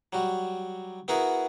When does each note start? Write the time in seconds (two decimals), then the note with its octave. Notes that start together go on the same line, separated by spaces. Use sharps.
0.13 F#3 G3 F#4
1.08 B3 E4 F#4 G#4 A#4 F#5